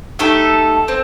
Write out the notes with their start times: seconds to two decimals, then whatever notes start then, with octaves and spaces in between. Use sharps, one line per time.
0.19 A3 D#4 G4 A4
0.88 C4